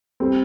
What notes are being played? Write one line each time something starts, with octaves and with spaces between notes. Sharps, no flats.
G3 C4